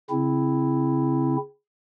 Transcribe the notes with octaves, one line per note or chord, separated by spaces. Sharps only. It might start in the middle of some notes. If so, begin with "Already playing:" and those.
C#3 C4 E4